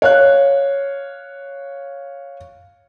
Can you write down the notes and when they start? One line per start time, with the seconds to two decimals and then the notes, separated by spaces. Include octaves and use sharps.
0.02 C#5 F5 F#6